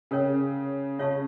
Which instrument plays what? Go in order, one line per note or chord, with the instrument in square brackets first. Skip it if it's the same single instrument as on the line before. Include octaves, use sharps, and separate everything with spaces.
[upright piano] C#3 [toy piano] A#4 C#5 G5
[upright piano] C#3 [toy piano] F4 C#5 F5 A5 C#6